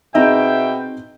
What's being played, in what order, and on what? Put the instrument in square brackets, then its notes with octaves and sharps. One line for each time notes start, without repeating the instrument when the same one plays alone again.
[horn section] B2 E5 G5 [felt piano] C4 D#4 G#4 [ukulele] D#5 A#5